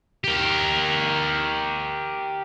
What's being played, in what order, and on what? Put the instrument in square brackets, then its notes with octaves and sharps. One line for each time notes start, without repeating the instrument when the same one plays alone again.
[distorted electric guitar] G4 A#4